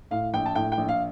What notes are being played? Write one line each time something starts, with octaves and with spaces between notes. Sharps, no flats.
A2 F5
A#1 G5
A5
A2 G5
G5
A#1
F5